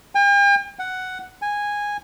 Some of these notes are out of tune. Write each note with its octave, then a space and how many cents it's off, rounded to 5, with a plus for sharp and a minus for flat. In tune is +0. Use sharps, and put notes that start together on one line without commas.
G5 +45
F#5 +5
G#5 -10